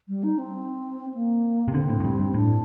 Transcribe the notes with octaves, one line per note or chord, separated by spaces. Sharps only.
G3
D#4
C4
A#3
C3
D3 C4
A2
A2
G2
G2
A2 D4